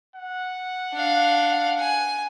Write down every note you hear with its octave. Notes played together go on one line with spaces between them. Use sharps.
F#5
D4 F5
G#5